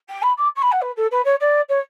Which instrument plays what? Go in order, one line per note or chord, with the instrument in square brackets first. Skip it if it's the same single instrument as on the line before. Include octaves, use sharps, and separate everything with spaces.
[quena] G5
B5
D6
C#6
B5
F#5
B4
A4
B4
C#5
D5
C#5